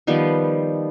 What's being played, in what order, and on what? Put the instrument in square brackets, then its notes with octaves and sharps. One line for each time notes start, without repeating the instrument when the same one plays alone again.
[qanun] D#3 F3 G3 B3